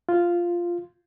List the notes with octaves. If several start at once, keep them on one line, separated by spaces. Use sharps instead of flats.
F4